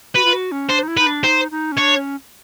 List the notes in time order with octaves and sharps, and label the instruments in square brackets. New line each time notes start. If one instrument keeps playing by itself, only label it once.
[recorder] F#4 [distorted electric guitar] B4
[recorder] F4
F#4
C#4
[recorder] D4 [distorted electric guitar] C5
[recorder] D#4
E4
[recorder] D#4 [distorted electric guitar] B4
[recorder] D4
[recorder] D#4 [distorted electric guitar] C5
[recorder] D#4
C#4
[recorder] D4 [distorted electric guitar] C#5
[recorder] C#4